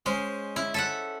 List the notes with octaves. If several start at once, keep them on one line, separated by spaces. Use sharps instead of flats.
G#3 C#4 C5
E4
A4 E5 F#5